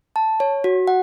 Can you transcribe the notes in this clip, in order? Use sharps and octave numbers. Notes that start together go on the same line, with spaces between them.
A5
C#5
F#4
F#5